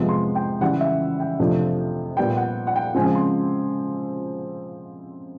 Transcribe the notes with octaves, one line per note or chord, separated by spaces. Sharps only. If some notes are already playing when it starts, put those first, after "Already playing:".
Already playing: F2 C3 F3 G#3 B3
C6
G5
C#3 E3 G3 F#5
E5
G5
F2 C3 F3 A3 D4
A#2 G3 B3 G5
F#5
F#5
G5
C#3 F3 G#3 C4 G#5
C6